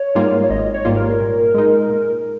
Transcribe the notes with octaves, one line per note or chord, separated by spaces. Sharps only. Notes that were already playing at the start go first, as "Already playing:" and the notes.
Already playing: C#5
G#2 G3 A#3 F4
C#5
G#1 D#5
C#5
G#2 G3 A#3 F4
A#4
A#2
G#3 D#4
A#2